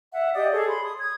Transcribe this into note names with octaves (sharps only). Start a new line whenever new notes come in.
E5 F#5
G4 D5 D#5 D#6
G#4 A4 C#5
B5 C6
D#6
D#6 G#6